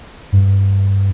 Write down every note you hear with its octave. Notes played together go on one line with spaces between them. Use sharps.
G2